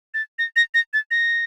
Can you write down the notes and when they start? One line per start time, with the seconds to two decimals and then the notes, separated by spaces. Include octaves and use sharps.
0.14 A6
0.39 A#6
0.56 A#6
0.74 A#6
0.94 A6
1.11 A#6